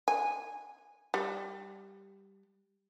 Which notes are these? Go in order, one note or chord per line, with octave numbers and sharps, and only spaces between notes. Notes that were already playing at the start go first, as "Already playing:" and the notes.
G#5
G3